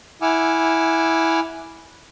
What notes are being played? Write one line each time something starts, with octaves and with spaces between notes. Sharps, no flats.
E4 F#5 G#5 D6 E6 F6